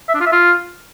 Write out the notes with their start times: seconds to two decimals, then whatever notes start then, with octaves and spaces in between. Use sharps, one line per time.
0.09 E5
0.14 D4
0.20 F4
0.26 E5
0.32 F4